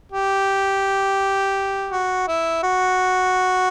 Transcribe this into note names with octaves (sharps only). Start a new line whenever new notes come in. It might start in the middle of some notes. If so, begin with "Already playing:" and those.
G4
F#4
E4
F#4